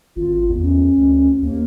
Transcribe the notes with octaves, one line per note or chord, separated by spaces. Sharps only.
G#1 F4
E2
C#4
D2
D#2 A#3